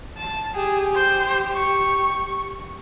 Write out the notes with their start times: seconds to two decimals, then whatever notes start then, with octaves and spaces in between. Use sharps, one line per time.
0.17 A5
0.55 G4 G#4
0.94 C5
1.55 C#6